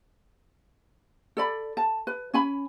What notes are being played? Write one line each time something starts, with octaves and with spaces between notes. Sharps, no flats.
A4 D5 B5
A5
B4
C#4 G#5 B5